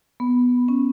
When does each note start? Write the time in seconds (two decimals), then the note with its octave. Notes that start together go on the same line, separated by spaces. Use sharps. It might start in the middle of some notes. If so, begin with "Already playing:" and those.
0.20 B3
0.68 C#4